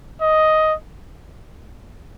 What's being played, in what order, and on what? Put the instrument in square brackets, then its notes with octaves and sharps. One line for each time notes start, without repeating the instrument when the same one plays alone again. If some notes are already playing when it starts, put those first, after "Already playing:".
[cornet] D#5